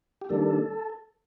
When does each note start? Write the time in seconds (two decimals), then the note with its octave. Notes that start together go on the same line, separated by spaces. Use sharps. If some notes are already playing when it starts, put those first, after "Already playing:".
0.21 G4
0.29 D#3 G3 A#3 D4 A4